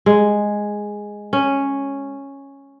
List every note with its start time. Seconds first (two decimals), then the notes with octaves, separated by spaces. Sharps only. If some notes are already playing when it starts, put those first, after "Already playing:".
0.06 G#3
1.33 C#4